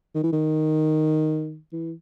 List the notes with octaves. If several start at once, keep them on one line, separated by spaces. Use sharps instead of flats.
D#3
E3
D#3
E3